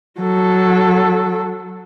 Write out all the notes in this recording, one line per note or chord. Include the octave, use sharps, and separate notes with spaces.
F#3 A4